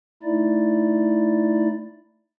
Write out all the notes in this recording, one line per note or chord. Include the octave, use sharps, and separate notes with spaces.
A3 D#4 E4 D5